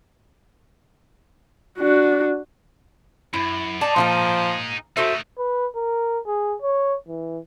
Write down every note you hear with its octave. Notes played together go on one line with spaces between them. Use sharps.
D4 F#4
F#2 E4
D#4 G#4 D5 A5
A#2 F3 E4 A#5
A3 D#4 F#4 A4 C5 E5
B4
A#4
G#4
C#5
E3